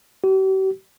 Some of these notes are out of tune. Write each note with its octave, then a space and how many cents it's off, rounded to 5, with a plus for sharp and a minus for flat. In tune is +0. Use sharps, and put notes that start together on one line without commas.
G4 -45